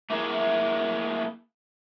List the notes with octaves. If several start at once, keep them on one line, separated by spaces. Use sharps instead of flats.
A3 A#3 E4 G4 G#4 E5